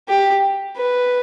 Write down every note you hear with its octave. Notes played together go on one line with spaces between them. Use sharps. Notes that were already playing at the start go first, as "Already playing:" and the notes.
G4
B4